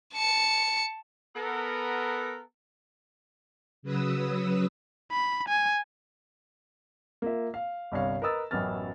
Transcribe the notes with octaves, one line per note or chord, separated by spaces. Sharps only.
A5 C#7
B3 A4 A#4
C#3 F#3 B4 D#6 E6
B5
G#5
A#3 F4 E5
F5
G1 C2 C#5 F5
A#4 B4 D#5 D#6 E6 A6
A1 F#2 F#3 B3 F6 A6